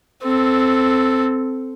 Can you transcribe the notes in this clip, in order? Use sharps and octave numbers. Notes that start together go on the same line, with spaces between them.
C4 A4